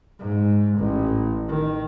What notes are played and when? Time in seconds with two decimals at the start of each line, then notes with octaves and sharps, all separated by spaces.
0.20 G#2
0.78 A1
1.48 D#3